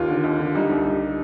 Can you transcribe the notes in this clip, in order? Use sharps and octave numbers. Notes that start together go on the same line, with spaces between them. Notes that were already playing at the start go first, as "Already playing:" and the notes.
Already playing: D#2 F4
D3
D#2
D3
G3 D#4
C2
G3